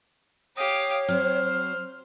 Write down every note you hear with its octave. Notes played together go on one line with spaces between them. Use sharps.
G4 C#5 F5 D#6
F#3 C4 C5 F6